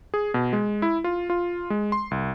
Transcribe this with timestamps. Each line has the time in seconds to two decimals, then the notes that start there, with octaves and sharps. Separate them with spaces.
0.14 G#4
0.34 B2
0.53 G#3
0.82 E4
1.04 F4
1.30 F4
1.70 G#3
1.92 C6
2.11 C2